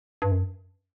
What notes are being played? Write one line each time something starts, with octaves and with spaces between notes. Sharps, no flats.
G2
F#2